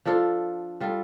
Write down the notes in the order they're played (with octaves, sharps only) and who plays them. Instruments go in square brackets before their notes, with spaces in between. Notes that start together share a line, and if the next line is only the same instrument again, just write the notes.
[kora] F3 D4 F4 A4
G3 F4 A4